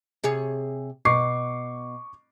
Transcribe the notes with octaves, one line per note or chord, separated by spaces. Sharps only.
C3 G#4 C#5
B2 C#6 D6 C7